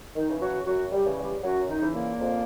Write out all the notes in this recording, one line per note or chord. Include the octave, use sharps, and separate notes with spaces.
D#3 D#4
C#3 E3
F#3 F#4
F#2 F#3 F#4
G3 G4
C#3 E3
G3 G4
F#2 F#3 F#4
D#3 D#4
C#3 E3
A#2 A#3
F2